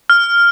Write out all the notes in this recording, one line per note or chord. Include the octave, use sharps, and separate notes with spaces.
F6